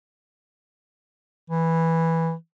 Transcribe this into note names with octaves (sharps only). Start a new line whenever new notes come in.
E3